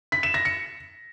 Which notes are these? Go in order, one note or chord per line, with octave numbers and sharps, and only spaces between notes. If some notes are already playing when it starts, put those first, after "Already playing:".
B6
E7
A#6
C#7